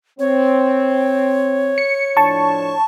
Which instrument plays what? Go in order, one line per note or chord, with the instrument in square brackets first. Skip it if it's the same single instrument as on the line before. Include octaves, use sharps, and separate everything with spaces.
[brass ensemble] C4 [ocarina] C#5
[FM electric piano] C#7
[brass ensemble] A2 F3 D4 [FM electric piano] A5 C#6